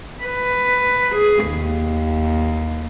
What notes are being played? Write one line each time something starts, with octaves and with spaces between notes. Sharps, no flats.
B4
G#4
D#2